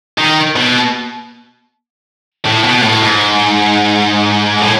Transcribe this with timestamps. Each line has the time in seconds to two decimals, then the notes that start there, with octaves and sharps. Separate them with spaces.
0.18 D#3
0.56 B2
2.45 A2
2.64 B2
2.83 A2
3.01 G#2
4.62 A2